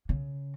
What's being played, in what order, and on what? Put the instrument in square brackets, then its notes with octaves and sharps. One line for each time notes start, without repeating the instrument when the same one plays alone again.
[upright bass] C#3